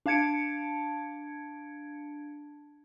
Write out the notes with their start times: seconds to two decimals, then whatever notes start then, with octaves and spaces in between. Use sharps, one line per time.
0.06 D4 F5 A5 G#6 C#7 D7